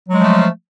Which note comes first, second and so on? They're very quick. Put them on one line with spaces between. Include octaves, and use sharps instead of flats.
F#3 G#3 F3 A3